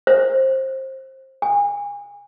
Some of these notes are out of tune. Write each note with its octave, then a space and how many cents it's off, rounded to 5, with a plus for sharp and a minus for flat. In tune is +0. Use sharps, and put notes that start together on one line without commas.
C5 +20
G#5 -30